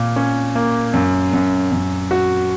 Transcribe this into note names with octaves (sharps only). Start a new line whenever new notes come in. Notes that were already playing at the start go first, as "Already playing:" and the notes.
Already playing: A#2 A#3
C#4
A#3
F#2
F#2
F#2
F#4